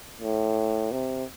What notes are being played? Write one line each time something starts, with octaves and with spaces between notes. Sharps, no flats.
A2
C3